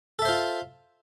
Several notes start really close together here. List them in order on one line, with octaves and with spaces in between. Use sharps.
A4 E5 C5 F4